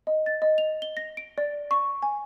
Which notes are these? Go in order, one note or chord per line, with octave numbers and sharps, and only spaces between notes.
D#5
A6
D#5
F7
G7
A#6
D7
D5
C#6
G#5